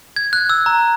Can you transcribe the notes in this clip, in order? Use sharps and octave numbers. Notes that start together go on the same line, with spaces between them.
G#6
F#6
E6
A#5